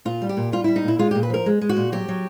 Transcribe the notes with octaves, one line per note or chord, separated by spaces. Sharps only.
A#2 F4
G3
G4
A#2
G3 F4
G3 E4
D#4
A#2 E4
G#3 F4
A#2 G4
B4
F3 A#4
G#3
G#3
F#4
A#2
F#3 G4
F#3